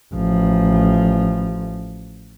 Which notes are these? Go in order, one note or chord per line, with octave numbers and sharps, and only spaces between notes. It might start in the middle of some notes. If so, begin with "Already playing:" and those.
A1 F3